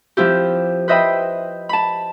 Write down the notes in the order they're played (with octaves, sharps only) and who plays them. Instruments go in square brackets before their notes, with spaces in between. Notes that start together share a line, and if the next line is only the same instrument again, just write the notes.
[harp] F3 C4 E4 G4
B4 C5 D#5 E5 G5 B5
A5 B5